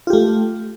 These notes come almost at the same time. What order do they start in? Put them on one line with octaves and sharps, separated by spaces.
F4 G4 A3